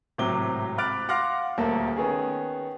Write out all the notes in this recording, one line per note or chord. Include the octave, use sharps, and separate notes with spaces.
G#1 A2 C3 F#3 D6 G7
B5 D6 F6 F#6 A6 D7
F5 F#5 C6 D6 F6 A#6
D#1 D2 A#3 A4
D#3 B3 C#4 G#4